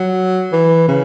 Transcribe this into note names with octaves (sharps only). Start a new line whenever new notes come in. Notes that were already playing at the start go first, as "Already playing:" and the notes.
Already playing: F#3
E3
C#3